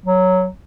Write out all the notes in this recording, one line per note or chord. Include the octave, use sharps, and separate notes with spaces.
F#3